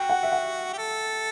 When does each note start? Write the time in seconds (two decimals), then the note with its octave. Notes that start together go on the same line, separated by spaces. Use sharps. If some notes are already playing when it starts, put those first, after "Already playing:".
Already playing: F#4 G5
0.09 F#5
0.23 E5
0.32 F#5
0.73 G4
0.78 A4